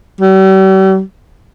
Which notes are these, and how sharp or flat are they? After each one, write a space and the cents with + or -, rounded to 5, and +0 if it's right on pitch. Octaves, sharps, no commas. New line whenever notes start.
G3 -45